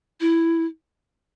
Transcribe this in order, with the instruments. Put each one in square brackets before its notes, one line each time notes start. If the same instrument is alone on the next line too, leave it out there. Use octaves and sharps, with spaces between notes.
[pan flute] E4